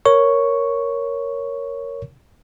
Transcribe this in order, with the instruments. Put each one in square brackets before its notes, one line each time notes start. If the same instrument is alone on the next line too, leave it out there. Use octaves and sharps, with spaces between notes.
[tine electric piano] A#4 C#5 C#6